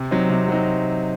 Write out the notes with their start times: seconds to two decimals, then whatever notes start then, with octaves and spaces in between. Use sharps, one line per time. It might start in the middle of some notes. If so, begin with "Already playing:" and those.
Already playing: C3
0.11 F#3 C4 D#4
0.30 C3
0.48 F#3 C4 D#4